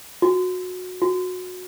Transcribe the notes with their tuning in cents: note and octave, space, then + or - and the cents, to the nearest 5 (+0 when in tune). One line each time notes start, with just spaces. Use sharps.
F#4 -20
F#4 -20